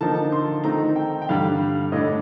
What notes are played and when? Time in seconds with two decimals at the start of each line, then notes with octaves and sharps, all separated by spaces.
0.01 D3 F3 A#3 D#4 A5
0.32 C6
0.64 D#3 A3 C4 D#4 A#5
0.96 G5
1.22 G5
1.29 G2 D3 G3 F5
1.92 A2 A3 D4 D#5